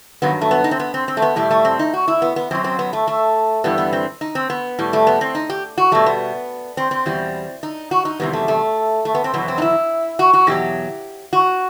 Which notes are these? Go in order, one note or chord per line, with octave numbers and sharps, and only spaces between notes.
G2 D#3 F#3 B3
A3
B3
D#4
C4
B3
C4
C4
A3
B3
A2 G3 A3
A3
C4
D#4
F#4
E4
B3
B3
F#2 F#3 C4
C4
B3
A3
A3
G2 E3 G3 B3
B3
C4
D#4
C4
B3
A2 G3
A3
B3
C4
D#4
G4
F#4
B2 G3 A3
B3
C4
C4
E2 B2 G3
D#4
F#4
D#4
E2 C3 D#3 G3 B3
A3
A3
A3
B3
C4
E2 B2 F#3 B3
C4
D#4
E4
F#4
F#4
E2 B2 F#3 G4
F#4